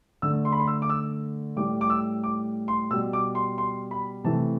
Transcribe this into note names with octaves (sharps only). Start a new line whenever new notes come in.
D3 A3 E6
C6
B5
C6
E6
D6
E6
A2 G3 D6
D6
E6
D6
C6
B2 G3 E6
D6
C6
C6
B5
C3 E3 A3 A5